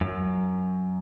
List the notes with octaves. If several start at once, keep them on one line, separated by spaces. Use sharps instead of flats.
F#2